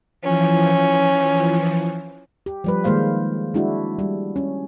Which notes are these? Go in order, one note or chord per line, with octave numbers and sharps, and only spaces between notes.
E3 F3 C#4
G4
F3 G3 B4
D#3 G#3 A#3 C5 F5
G#3 D4 E4 F#4
G3
C#4